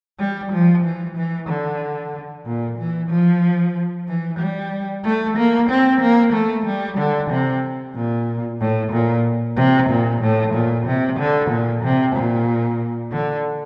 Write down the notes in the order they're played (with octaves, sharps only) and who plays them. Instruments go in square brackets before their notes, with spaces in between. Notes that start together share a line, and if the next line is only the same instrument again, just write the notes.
[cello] G3
F3
E3
E3
D3
A#2
E3
F3
E3
G3
A3
A#3
C4
A#3
A3
G3
D3
C3
A#2
A2
A#2
C3
A#2
A2
A#2
C3
D3
A#2
C3
A#2
D3